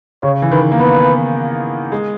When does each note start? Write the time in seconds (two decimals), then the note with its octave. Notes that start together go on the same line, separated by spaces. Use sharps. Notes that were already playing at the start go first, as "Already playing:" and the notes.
0.23 C#3 C#5
0.42 E3
0.52 D#3 B4
0.72 A#3
0.79 B3 B4
1.92 G#3